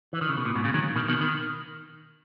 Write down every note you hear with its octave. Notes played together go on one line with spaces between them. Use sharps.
E3
D#3
C#3
B2
A#2
G#2 B2
A#2 C#3
D#3 F#3
B2 D#3
B2 D#3
D#3